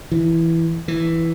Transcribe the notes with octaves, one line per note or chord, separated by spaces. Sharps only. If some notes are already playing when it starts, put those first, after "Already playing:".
E3
E3